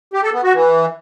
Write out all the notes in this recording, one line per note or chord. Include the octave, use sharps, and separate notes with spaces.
G4
A4
B3
F#4
E3